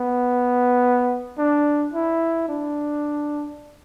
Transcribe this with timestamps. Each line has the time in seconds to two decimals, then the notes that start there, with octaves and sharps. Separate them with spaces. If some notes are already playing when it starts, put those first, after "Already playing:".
Already playing: B3
1.38 D4
1.94 E4
2.48 D4